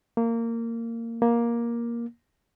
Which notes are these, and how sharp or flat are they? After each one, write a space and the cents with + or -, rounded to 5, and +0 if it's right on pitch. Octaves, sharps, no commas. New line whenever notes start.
A#3 -20
A#3 +10